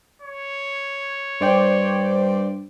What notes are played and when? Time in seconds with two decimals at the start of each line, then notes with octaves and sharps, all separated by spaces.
0.22 C#5
1.41 G2 C5 D5 G5